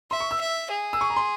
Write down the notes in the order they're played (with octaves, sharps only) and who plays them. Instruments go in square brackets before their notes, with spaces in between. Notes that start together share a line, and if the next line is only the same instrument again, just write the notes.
[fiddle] E5 [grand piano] C6
[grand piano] C#6
E6
[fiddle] E5
G#4
[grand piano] E6
C#6
A#5
C6